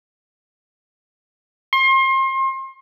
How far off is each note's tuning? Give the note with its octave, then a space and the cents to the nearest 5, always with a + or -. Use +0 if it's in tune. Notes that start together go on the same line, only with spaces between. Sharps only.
C6 +35